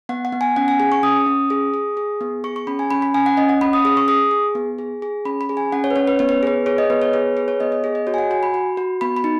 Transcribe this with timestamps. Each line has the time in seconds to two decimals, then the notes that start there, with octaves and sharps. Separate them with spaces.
0.09 B3 F#5
0.25 F#5
0.32 B3
0.41 G#5
0.56 C#4 F#5
0.68 G#5
0.80 G#4 G#5
0.92 C#6
1.03 C#4 D#6
1.27 C#4
1.50 G#4
1.74 G#4
1.97 G#4
2.21 B3
2.44 G#4 C#6
2.56 C#6
2.67 C#4 B5
2.79 G#5
2.91 C#4 B5
3.02 B5
3.14 C#4 G#5
3.26 F#5
3.37 C#4 D#5
3.49 F#5
3.61 C#4 B5
3.73 D#6
3.85 G#4 D#6
3.97 C#6
4.08 G#4 D#6
4.31 G#4
4.55 B3
4.78 G#4
5.02 G#4
5.25 C#4 B5
5.41 B5
5.49 G#4
5.57 G#5
5.72 C#4 F#5
5.84 C#5
5.90 B4
5.96 C#4 C#5
6.07 B4
6.19 B3 C#5
6.29 B4
6.43 G#4 B4
6.66 G#4 C#5
6.78 D#5
6.90 B3 B4
7.02 C#5
7.13 G#4 B4
7.37 G#4 B4
7.48 C#5
7.60 B3 D#5
7.72 D#5
7.84 G#4
7.95 D#5
8.07 F#4 C#5
8.14 G#5
8.18 F#5
8.31 F#4 G#5
8.43 B5
8.54 F#4
8.77 F#4
9.01 B3 B5
9.16 B5
9.24 D#4